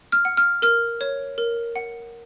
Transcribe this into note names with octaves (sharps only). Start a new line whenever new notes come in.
F6
F#5
F6
A#4 F6
C#5
A#4
F#5